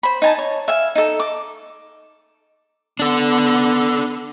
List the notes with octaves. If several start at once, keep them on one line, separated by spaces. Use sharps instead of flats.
C5 B5
D#4 G#5 A5
C#5
E5 F5 G#5
D#4 A4
D6
B3 D4 A4